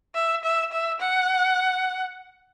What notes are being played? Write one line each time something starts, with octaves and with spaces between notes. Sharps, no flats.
E5
E5
E5
F#5